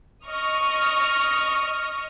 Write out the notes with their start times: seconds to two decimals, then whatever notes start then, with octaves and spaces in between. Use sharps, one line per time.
0.24 D#5 C#6 D#6 F6